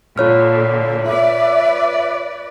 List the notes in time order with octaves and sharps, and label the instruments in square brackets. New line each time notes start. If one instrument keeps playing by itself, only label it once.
[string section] A#2 D3 [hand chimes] F4 C#5 F6
[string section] B4 D5 [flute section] E5 D6